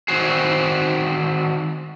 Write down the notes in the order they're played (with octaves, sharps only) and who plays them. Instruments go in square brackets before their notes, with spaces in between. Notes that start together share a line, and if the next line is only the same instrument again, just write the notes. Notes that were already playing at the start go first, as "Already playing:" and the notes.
[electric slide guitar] D#3 C4 F#4 G#4